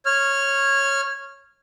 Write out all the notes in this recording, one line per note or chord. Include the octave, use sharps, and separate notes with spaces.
C#5 F6